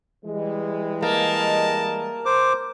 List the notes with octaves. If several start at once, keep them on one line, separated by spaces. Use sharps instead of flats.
E3 G3 G#3
A#3 D#5 A5
C5 D6